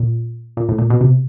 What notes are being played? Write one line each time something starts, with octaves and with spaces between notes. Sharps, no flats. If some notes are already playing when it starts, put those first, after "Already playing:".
Already playing: A#2
A#2
A2
A#2
B2
C3